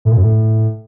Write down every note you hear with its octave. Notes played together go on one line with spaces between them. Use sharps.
A2
A#2
F#2
A2